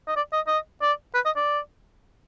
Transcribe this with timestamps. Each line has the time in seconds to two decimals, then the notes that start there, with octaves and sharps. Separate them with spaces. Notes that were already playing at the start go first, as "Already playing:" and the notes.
0.08 D#5
0.17 D5
0.33 D#5
0.47 D#5
0.82 D5
1.15 B4
1.25 D#5
1.36 D5